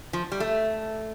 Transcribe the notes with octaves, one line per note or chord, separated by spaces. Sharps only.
F3
G3
A3